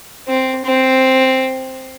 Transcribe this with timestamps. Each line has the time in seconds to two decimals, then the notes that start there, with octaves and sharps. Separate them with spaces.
0.28 C4
0.65 C4